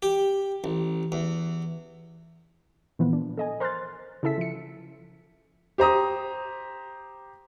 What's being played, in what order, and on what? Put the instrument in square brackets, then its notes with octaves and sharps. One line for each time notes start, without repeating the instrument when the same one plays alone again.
[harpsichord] G4
A1
E2
[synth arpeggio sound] A#2 E3 F3 B3
D4
A4 D#5 G#5
A#4 C5 C6 F6 F#6 A6
C#3 E4 A4 E5 B6
F3 C#7
[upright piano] G4 C5 A#5 D#6